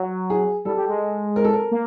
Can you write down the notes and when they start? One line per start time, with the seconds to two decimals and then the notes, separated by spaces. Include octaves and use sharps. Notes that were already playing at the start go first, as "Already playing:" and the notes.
Already playing: F#3
0.30 G#4
0.65 G3 A4
0.77 G3
0.89 G#3
1.36 A#4
1.44 A4
1.53 A#4
1.71 A#3